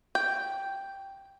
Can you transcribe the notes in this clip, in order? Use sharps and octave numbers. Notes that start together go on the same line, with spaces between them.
G5